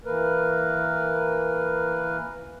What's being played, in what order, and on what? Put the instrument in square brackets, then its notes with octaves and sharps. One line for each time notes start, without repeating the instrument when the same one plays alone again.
[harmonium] E3 A#3 A#4 B4